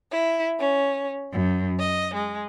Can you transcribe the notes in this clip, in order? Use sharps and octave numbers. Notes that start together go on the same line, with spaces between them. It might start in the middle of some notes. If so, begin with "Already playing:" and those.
E4
C#4
F#2
D#5
G#3